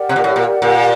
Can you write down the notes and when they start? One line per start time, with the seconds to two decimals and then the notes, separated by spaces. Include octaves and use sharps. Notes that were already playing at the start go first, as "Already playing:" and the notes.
Already playing: G4 A#4 D5 F#5
0.09 C3
0.16 A#2
0.24 A2
0.36 A#2
0.62 A#2